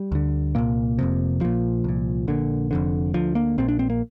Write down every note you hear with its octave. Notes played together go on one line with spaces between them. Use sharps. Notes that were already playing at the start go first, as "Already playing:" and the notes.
Already playing: G3
D2 D3
C2 A#2 A#3
F1 F2 C3
A#1 A#2 F3
C2 A#2
A#1 A#2 D3
F1 F2 D3
D2 D3 F3
A#3
A#1 A#2 C4
D4
C4
A#3